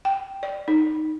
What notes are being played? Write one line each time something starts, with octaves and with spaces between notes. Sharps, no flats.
G5
D5
D#4